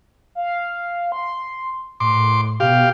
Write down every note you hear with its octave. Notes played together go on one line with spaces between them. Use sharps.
F5
C6
A2 C6 D6
B2 G4 F5